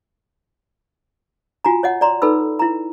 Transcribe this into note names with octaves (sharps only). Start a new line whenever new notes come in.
F4 F#4 G#5 A#5
C#5 D#5 F#5
D5 A#5 C6
D#4 A4 B4 B5 E6
E4 A#5